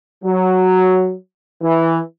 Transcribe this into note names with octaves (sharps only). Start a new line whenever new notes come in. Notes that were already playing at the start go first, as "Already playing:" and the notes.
F#3
E3